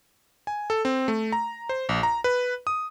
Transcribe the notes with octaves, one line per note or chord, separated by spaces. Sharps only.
G#5
A4
C4
A3
A#5
C5
A#1
A#5
B4
D#6